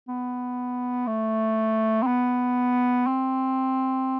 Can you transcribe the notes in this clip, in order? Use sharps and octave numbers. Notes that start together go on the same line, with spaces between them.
B3
A3
C4
B3
C4